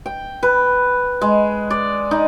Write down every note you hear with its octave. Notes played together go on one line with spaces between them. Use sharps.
G5
B4
G#3
D5
D#4